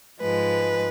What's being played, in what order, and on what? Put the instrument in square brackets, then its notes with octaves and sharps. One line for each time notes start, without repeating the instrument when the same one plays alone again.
[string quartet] G#2 F3 G#3 B4